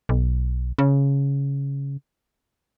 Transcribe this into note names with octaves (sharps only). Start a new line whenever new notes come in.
B1
C#3